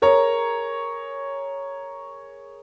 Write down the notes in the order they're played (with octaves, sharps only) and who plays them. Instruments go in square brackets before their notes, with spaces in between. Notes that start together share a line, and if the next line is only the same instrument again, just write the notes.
[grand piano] G#4 A#4 C#5 A#5